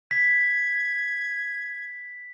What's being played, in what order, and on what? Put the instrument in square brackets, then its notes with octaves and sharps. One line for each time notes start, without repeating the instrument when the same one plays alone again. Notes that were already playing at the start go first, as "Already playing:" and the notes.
[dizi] G#6 [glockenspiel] B6